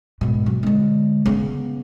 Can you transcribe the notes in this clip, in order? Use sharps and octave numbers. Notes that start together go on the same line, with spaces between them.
G#2 B2
F#3
D3 G#3
C#3 B3